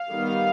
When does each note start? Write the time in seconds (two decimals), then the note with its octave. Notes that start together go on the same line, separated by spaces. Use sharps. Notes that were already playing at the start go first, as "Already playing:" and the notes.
Already playing: F5
0.10 D#3 G3 B3